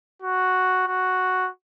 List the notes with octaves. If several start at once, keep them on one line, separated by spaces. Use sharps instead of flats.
F#4
F#4